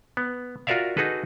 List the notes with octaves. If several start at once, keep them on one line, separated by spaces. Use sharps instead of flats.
B3
F4 F#4 A#4 D5 E5 F5
D#4 F#4 G#4 A4 B4